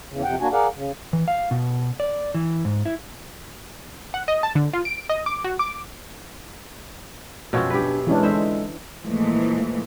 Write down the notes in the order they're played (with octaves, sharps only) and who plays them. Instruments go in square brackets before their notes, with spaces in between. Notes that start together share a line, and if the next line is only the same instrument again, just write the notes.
[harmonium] E2 C#3
F2 C3 F#5 G5
A#3 D4 F#4 G#5
G#4 A#4 D5 F5 F#5
C#3
[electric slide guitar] E3
F5
B2
D5
E3
G#2
E4
[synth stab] F#5
D#5
A5
D3
F4
D7
D#5
D6
F#4
D6
[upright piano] F#2 C#5 [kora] B2 F3 C4
[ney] D4 [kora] G4 B4
[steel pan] E3 C#4 D4 [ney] G#3
[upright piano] D3 D#4 E4 [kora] C5 E5
[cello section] A#2 E3 F3 G#3 A3